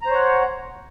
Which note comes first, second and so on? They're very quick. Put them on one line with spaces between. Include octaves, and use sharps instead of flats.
A#5 C5 C#5 F#5